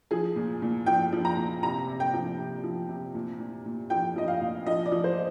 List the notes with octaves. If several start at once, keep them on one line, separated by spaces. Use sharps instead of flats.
F3 G#4
A#2
A#2
F3 G5
F3
A#5
A#2
C3 A#5
C3
G5
F3
C3
F3
C3
A#2
A#2
A#2
F3 G5
F3 D#5
F5
A#2
F3 D#5
D5
F3
C5